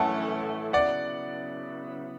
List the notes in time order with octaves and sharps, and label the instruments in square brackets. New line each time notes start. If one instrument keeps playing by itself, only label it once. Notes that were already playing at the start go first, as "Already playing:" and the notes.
Already playing: [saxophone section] A2 E3 A3 C#4 [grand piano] F#5 A5
[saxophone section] C#3 F#3 B3 E4 [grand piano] D5 F#5